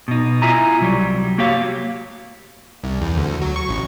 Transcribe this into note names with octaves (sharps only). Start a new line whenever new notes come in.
B2 D#4
E4 F4 E5 G#5 A#5
C2 F#3 G3
A#3 F#4 G4 C#5 F5
C2
E2
D2
F#3
C#6
A1